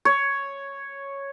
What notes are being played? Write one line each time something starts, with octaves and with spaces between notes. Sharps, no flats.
C#5